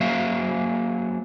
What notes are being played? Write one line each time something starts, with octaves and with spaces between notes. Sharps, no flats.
F#3 A#3 C5 E5 F5